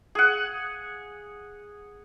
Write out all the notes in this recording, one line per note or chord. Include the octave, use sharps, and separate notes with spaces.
G#4 F#5